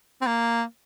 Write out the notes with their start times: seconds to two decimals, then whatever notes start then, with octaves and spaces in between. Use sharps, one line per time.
0.21 C4
0.26 A#3